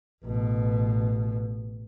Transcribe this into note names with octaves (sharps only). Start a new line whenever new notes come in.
A1 B2